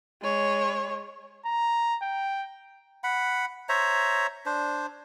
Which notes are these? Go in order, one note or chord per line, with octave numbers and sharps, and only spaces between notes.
G#3 C#5
A#5
G5
F#5 B5
C5 C#5 E5 A#5
D4 C5